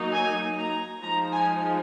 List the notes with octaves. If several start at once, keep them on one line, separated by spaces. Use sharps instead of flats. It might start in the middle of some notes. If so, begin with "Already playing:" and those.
Already playing: F#3 A#3 D#4
G#5
A#5
F3 G#3 D#4 A#5
G#5